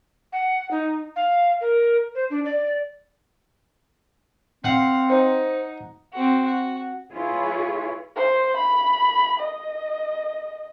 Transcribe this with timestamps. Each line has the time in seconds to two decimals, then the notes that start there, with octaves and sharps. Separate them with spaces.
0.32 F#5
0.71 D#4
1.16 F5
1.61 A#4
2.15 C5
2.30 D4
2.45 D5
4.65 C4 F5 F#5
5.10 D#4 C5
6.13 C4 F#4
6.44 F#4
7.13 E4 F4 G#4 B4 C#5
8.17 C5
8.57 B5
9.40 D#5